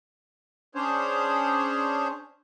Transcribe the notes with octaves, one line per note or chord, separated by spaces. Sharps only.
C#4 D4 G#4 C5 C#5